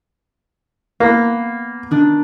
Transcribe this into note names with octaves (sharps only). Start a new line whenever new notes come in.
A#3 B3 A#6
D#3 D4